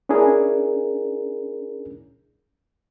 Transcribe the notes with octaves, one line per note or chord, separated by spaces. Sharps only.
C#4 D4 E4 G#4 A#4